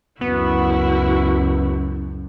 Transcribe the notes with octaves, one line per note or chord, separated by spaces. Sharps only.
C#2 F#2 B3 E4 F#4